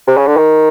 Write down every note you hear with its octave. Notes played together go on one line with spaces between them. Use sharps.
C3
C#3
D3
D#3